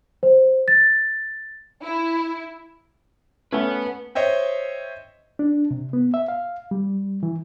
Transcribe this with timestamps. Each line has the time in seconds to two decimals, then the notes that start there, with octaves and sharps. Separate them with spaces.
0.23 C5
0.68 A6
1.83 E4
3.52 A3 C#4 B4 E5 F#5
4.15 C5 C#5 D#5 E5 G5
5.39 D4
5.71 C3
5.93 B3
6.14 E5
6.28 F5
6.71 G3
7.23 E3